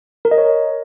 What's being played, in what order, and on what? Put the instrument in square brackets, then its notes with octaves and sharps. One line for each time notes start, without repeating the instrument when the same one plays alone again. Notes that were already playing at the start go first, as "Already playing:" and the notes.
[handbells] A#4
D#5
C#5